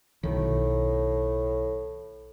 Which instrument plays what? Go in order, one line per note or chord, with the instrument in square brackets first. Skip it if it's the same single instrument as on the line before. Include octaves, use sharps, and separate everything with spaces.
[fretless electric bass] B1 D#3 [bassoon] A2